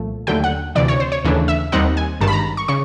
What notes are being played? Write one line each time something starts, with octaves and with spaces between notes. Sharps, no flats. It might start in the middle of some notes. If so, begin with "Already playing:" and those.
Already playing: C2 A#2 F3 A3
D#2 D3 F#3 A3 G5
F#5
D2 C3 E3 D5
C#5
C5
C#5
D#2 C#3 E3 A3 D4
E5
D#2 D#3 G3 C4 D#4 F#5
G#5
G#1 G2 D#3 A5
B5
A#5
C#6
C#3 C#6